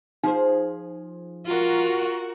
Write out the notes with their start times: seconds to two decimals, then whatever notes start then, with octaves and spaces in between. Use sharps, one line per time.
0.24 F3 D#4 G#4 C5
1.46 F4 F#4 A#4